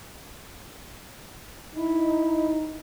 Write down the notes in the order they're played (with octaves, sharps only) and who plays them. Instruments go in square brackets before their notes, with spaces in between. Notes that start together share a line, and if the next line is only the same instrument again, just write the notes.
[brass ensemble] D#4 [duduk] E4